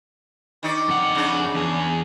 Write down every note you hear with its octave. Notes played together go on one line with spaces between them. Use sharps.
D#3 D#4 D5
F2 F#5
C#3 D4
E2 G#4